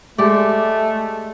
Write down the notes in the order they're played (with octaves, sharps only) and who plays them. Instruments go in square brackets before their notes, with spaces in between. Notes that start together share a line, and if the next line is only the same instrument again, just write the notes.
[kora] G#3 G4 D5 [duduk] A3